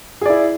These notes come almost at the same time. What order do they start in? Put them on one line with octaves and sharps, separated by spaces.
G#4 D5 E4